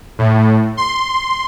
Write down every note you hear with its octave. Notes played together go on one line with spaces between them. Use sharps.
A2
C6